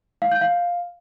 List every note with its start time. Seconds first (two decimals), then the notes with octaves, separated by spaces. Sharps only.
0.22 F5
0.32 G6
0.41 F5